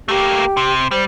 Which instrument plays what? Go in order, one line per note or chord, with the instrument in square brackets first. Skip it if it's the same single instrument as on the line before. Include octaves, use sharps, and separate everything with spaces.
[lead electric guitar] A3 A#3 [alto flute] G4
[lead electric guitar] C3
[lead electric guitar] G3 [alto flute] C5